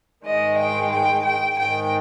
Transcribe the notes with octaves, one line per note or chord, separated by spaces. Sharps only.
G#2 D#3 G#3 D#5
G5
G5
G5
G#2 D#3 G#3 G5